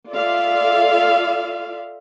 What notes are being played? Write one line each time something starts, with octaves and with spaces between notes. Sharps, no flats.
F4 A4 D5 E5 F5